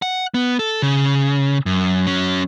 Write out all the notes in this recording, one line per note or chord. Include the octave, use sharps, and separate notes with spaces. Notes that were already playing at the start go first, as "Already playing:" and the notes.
F#5
B3
A4
C#3
F#2
F#3 C#4